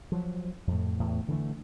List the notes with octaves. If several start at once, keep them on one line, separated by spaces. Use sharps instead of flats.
F3 F#3
F2 A2
E2 A2
D3 E3 A3